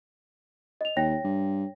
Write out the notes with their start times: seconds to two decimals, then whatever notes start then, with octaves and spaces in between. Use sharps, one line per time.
0.81 D#5 F7
0.96 D#2 C#5 G5 A#6
1.24 G2